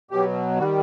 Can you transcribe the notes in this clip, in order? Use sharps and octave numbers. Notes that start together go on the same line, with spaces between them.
B2 F#3 G4
D#3 G3 F#4